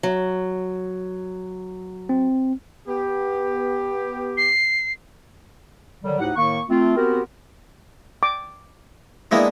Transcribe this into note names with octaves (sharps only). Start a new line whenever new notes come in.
F#3
C4
B3 G4
C7
D3 D#3 F#3 G3
D2 A2 D#4 G4 F#5
A2 D#3 A#3 C#6
A3 C4 F4
B3 C4 F#4 G4 A#4
D6
G#3 A#3 B3 D4 E4 F4